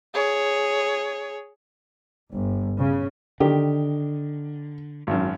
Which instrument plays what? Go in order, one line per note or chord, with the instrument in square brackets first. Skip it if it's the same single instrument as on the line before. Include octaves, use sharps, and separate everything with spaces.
[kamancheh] G#4 C#5
[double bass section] G1
C#3
[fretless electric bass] D3 [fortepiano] D#3 G4
[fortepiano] G#1 F#2